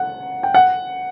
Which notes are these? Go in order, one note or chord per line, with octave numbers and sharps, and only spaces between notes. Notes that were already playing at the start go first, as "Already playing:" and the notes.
Already playing: F#5
G5
F#5